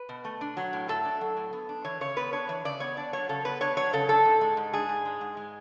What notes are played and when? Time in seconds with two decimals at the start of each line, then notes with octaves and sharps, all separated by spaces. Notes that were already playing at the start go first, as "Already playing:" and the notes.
Already playing: B4
0.09 B2
0.25 A3
0.41 D4
0.57 F#3
0.73 A2
0.88 A3 A4
1.05 D4
1.21 F#3
1.37 A2
1.53 B3
1.69 D4
1.85 E3 C#5
2.01 C#3 C#5
2.16 B3 B4
2.33 D4 C#5
2.49 E3 C#5
2.65 C#3 D5
2.80 B3 C#5
2.97 D4 D5
3.13 F#3 C#5
3.29 C#3 A4
3.45 B3 B4
3.61 D4 C#5
3.77 F#3 C#5
3.93 C#3 A4
4.09 D4 A4
4.25 G#2
4.41 G#3
4.57 G#2
4.73 D4 G#4
4.89 G#2
5.05 G#3
5.21 G#2
5.37 G#3